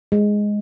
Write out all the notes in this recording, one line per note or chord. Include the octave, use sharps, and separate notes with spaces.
G#3